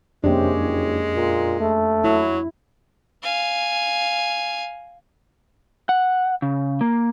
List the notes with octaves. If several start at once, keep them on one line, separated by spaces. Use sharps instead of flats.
F2 C3 G#3 A#3 C#4 D4 G4
F#1
A#2
A3
F#3 E4
F5 G#5
F#5
C#3
A#3